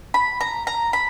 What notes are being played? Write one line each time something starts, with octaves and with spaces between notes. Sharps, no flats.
B5
A#5
A#5
B5